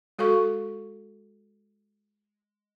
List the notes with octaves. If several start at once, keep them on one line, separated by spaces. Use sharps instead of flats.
G#3 F#4 A4 F5 C#6